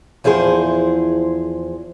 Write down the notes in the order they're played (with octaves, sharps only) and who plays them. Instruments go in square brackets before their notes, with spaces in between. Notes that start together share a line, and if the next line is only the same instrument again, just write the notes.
[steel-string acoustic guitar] E2 F3 E4 G#4 C5